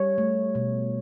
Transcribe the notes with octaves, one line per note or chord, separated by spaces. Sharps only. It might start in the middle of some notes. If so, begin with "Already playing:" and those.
Already playing: G3 C#5
A3
B2